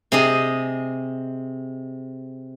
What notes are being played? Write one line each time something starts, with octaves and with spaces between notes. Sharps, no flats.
C3 G#4 D#5